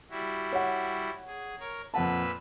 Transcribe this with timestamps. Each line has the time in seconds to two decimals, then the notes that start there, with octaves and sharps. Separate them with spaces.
0.10 G3 E4 F#4
0.53 C#5 F#5
1.26 G#4
1.60 A#4 C#5
1.94 F2 A#2 B4 F#5 A5 E6